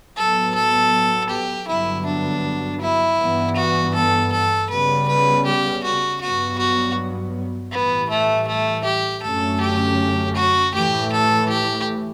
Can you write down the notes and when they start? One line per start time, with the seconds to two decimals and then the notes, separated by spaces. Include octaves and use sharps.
0.16 A2 F#3 B3 A4
0.55 A4
1.30 G4
1.68 G2 D3 F#3 B3 E4
2.06 D4
2.81 E4
3.19 G2 E3 B3
3.56 F#4
3.95 A4
4.32 A4
4.69 C#3 G3 B3 B4
5.08 B4
5.46 G4
5.84 F#4
6.21 G2 F#3 B3 F#4
6.58 F#4
7.72 A2 E3 G3 B3
8.09 A3
8.47 A3
8.85 G4
9.23 F#2 D3 A3 C#4 A4
9.61 G4
10.36 F#4
10.74 A2 E3 A3 G4
11.12 A4
11.49 G4